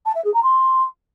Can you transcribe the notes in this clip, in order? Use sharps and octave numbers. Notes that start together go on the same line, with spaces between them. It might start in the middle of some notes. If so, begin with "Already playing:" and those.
A5
E5
G#4
A#5
C6